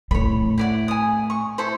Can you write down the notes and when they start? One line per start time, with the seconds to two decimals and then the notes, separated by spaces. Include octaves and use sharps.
0.11 A2 A3 C#5 B5
0.58 E4 D5 F#5
0.88 G#5 D#6
1.30 C#6
1.58 E4 A4 C5